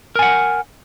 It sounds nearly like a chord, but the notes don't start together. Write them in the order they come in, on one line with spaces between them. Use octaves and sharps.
A#4 G#5 F#5